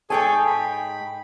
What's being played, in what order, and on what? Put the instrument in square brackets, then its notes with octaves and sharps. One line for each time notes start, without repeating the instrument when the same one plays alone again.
[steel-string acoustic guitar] G#2 G5 G#5 [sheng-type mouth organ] G#4 A4 C#5
[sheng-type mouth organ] B5